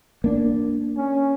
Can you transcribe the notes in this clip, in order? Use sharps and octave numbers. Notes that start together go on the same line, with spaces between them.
A#3 D4
C#4